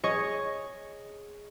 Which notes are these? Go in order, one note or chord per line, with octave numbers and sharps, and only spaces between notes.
G#4 C#5 D#5 C#6